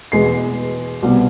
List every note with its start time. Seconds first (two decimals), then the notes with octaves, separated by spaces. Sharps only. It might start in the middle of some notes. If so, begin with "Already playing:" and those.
0.12 E2 B2 G#3 B3 C7
1.03 C2 B2 G3 B3